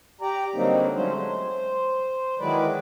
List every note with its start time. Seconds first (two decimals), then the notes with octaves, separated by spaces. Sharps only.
0.21 G4 D5 A#5
0.54 D3 F#3 G3 A#3 C4 D#4
0.95 F#3 G#3 A3 C#4 C5
1.16 C5
2.39 D#3 E3 F#3 G#3 B4 D5